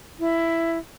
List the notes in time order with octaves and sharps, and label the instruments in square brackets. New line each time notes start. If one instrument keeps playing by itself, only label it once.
[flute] E4